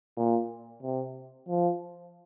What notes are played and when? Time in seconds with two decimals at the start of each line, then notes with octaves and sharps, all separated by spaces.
0.17 A#2
0.83 C3
1.48 F3